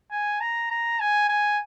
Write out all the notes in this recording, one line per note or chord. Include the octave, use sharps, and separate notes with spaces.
G#5
A#5
A#5
G#5
G#5